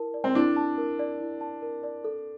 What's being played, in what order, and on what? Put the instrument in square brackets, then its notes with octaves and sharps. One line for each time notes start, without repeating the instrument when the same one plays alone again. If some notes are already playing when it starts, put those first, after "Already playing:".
Already playing: [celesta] E4 A#4 A5
D5
[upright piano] C4
[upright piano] D4 [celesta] E4
[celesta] A5
A#4
D5
E4
A5
A#4
D5
A4